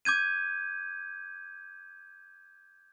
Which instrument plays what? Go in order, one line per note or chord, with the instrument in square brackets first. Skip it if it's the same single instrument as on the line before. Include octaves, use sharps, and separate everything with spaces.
[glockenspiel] D6 G6 G#6 D#7